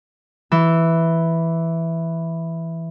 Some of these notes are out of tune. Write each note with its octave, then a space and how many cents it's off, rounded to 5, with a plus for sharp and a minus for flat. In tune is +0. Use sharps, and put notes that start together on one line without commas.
E3 +0 E6 +0